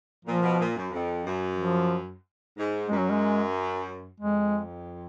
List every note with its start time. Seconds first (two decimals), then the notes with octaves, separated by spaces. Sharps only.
0.25 A#2 F3
0.41 B2
0.57 A#2
0.74 F#2
0.90 F2
1.23 F#2
1.57 F3
2.55 G#2
2.88 F#2 G#3
2.99 F#3
3.10 G#3
4.20 F2 G#3